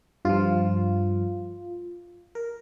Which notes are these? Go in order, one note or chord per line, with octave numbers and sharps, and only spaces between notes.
G2 F3 F4
A#4